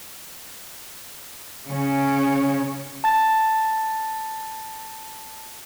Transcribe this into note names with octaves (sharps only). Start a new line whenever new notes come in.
C#3 C#4
A5 A6